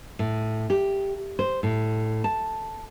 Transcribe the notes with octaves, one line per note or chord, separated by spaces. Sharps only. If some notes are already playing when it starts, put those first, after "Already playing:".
A2
G4
C5
A2
A5